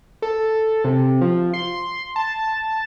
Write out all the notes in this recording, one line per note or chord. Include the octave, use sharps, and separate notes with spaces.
A4
C3
F3
C6
A5